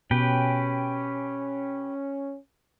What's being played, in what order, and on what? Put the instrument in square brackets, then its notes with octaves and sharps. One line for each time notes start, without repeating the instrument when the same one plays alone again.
[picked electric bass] B2 [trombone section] C#4 [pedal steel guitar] G4 B4 G5